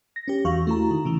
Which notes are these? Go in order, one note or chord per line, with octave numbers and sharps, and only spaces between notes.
A#6
C#4 G4
E2 E3 F#4 F5 C#6
A3 E4 A#5
D#3
C#3 E3